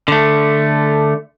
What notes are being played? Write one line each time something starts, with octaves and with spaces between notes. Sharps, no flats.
D3 A3